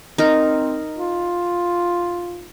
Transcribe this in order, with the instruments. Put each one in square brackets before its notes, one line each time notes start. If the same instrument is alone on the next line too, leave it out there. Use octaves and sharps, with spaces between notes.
[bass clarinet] C4 [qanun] D#4 A#4
[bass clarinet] F4